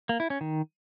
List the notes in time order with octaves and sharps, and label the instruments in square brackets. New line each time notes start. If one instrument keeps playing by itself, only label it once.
[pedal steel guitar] A#3
E4
C#4
D#3